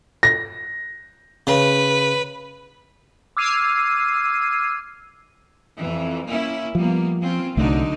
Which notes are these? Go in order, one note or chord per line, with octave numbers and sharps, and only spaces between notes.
A#6
C#3 B4
D6 E6 F6 G#6 C7 D#7
F2 E3
A#3 C#4 E4
F3 G3 A#3 B3
C4 C#4 F4
C2 D3 F#3 A3 D#4